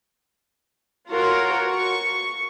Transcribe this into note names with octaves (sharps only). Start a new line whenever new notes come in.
F4 F#4 A#4 C#5
C#6